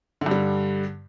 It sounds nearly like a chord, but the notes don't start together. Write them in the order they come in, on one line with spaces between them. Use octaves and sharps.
D3 G2 G3